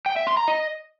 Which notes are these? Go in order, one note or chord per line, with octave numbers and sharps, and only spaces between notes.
G5
E5
C6
A#5
D#5